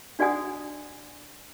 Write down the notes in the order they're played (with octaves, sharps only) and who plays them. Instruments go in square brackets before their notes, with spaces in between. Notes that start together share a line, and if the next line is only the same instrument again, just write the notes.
[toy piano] D4 F#4 D5 F#5 G#5 D#6